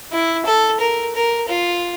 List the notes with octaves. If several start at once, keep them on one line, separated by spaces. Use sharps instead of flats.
E4
A4
A#4
A#4
F4